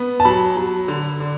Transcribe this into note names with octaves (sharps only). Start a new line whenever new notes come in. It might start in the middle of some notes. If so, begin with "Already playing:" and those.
Already playing: B3
A5
F#3 B5
F#3
D3
D3